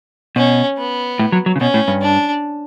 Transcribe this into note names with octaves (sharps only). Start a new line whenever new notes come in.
B2 C#4
B3
A2
F#3
F#3
C#3
B2 C#4
A2
G2
D4